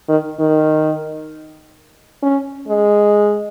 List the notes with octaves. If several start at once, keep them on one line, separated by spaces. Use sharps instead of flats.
D#3
D#3
C#4
G#3